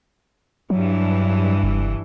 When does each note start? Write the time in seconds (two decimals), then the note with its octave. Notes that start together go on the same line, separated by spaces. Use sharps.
0.70 G2 E3 F#3
1.63 F#1